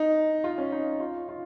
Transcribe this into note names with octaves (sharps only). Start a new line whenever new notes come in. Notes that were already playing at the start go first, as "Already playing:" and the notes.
Already playing: D#4
F4
C#4
D#4
F4
F4